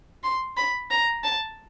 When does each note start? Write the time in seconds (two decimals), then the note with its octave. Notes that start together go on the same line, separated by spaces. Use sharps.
0.23 C6
0.57 B5
0.91 A#5
1.24 A5